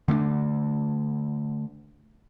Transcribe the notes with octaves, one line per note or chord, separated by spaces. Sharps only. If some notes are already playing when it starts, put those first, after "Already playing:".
D3 A3 A#3 D4